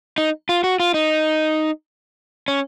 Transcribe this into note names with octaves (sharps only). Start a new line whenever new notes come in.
D#4
F4
F#4
F4
D#4
C#4